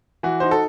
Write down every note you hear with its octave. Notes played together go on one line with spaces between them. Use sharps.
E3 F#4
D#4 C5
A4